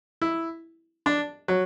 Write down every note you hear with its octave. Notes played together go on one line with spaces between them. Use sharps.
E4
D4
F#3